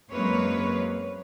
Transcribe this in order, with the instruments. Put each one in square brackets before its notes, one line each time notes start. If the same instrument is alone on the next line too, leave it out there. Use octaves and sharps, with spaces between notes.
[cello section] F#2 G#3 A#3 C4 B4 C#5